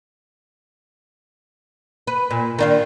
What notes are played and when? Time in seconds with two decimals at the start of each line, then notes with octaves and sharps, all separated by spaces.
2.07 B4
2.31 A#2
2.59 D#3 D4 F4